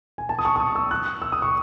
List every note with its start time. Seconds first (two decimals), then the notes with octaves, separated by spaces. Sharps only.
0.18 G#5
0.29 A5
0.39 D#6
0.45 C#6
0.56 C#6
0.60 D#6
0.75 E6
0.91 F#6
1.22 E6
1.32 D#6
1.42 C#6